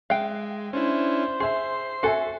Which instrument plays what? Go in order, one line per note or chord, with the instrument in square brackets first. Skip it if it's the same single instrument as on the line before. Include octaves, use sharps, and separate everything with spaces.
[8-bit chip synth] G#3 [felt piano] E5 F#6 [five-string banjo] F5 G5
[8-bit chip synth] C#4 D4 E4 [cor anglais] C5
[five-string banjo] G#4 [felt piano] E5 C6 [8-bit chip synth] C7
[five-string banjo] F#4 A4 [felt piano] E5 G#5 C6